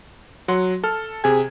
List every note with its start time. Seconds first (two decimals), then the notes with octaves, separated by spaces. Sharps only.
0.48 F#3 F#5 C6
0.84 A4 F6
1.24 C3 G#4 G#6